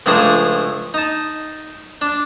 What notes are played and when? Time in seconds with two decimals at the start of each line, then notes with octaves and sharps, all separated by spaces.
0.06 C#2 A2 F3 D4 G#4 A#5
0.94 D#4 A5
2.01 D4